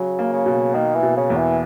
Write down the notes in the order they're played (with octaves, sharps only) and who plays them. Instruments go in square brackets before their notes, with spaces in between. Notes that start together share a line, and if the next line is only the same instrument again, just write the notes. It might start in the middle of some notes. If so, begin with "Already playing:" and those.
Already playing: [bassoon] C#3 [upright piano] F#3
[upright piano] A#3
[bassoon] C#3
[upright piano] B2
[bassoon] D#3 [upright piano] A#3
[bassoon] E3
[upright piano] B2
[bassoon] C#3
[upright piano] E2
[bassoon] E3